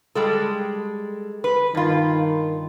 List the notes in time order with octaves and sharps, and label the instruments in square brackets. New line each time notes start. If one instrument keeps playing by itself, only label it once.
[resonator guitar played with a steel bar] G3 G#3 A4
B4
[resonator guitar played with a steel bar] G2 F4 [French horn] D#3